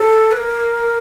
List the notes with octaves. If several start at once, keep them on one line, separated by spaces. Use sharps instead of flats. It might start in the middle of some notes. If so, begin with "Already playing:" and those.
Already playing: A4
B4
A#4